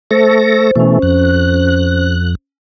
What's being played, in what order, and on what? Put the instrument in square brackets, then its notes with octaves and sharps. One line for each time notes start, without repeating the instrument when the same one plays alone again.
[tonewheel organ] A3 A4 A#6 [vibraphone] C5
[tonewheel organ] B2 E3 A3 [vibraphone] C#4 C5
[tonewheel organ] F2 F#6